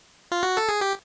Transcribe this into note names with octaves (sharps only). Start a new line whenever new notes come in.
F4
F#4
A4
G#4
G4